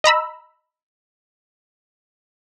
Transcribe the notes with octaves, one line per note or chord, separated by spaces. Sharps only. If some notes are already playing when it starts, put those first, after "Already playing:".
D#5 A#5 B5 E6